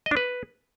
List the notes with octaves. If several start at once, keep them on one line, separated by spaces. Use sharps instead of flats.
D#5
D4
B4